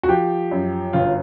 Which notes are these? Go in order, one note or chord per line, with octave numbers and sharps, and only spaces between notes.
F#4
F3 G4
F#2
G1 F4